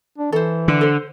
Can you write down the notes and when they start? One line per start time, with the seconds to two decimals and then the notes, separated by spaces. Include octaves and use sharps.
0.18 D4
0.32 E3 A4 C5
0.68 D3
0.81 A4 C5